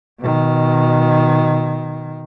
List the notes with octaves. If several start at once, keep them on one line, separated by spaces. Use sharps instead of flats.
B2 D#3